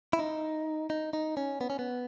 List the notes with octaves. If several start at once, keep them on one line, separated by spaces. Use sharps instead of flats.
E4
D#4
D#4
D#4
C#4
B3
C#4
B3